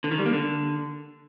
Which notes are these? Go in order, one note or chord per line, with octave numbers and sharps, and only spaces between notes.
D3
D#3
G3
A#3
D3